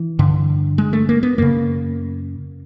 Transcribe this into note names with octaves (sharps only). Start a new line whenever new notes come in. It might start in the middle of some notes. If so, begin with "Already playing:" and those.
Already playing: E3
G2 D3
G#3
A3
A#3
B3
F#2 C#3 A#3